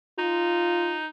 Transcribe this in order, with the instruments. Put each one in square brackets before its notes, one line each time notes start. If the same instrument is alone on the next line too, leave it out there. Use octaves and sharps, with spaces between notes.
[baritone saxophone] D#4 [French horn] F4